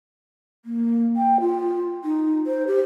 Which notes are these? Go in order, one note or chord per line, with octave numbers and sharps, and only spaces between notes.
A#3
G5
F4
D#4
C5
G4